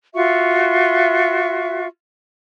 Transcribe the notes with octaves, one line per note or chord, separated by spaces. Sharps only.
F4 F#4 E5 C#6